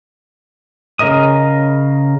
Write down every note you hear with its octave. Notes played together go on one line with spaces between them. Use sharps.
C#3 A#4 D#5 D#6